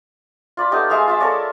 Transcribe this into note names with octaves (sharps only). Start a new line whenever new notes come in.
F4 D5 B5
A3 B3 D#4 G4
G#3 G#4 E5 F5
F4 E5 B5
A4 A#4 C#5 D5